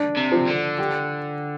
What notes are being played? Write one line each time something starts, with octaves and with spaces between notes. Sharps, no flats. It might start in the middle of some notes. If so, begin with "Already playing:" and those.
Already playing: D4
C3
F3
D3
G4